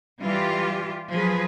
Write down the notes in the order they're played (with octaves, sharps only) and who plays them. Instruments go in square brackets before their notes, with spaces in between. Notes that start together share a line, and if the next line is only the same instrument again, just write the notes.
[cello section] E3 G3 F4 G4
F3 F#3 G#4 B4